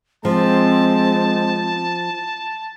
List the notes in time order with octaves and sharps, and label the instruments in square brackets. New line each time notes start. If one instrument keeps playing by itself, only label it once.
[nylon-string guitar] F3 [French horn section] G#3 [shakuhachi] C4 [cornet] A5